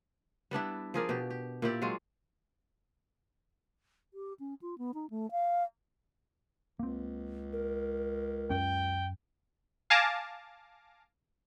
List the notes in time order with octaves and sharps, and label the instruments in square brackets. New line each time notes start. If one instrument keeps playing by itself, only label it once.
[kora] G3 B3 D4 E4
F3 G#4 A#4 D5
B2 G4
G4
A#2 E4 G4 D5
F#3 G#3 F4
[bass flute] G4
C#4
F4
B3
D#4
A3
F5
[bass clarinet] C#2 [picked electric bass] A#3 C4
[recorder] A#4
[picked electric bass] F#2 C#4 [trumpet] G5
[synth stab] F5 G#5 A5 D6 A#6